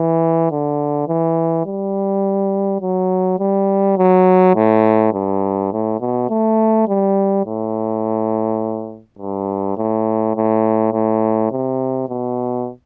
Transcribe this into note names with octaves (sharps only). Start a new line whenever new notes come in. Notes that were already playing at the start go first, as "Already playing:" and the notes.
Already playing: E3
D3
E3
G3
F#3
G3
F#3
A2
G2
A2
B2
A3
G3
A2
G2
A2
A2
A2
C3
B2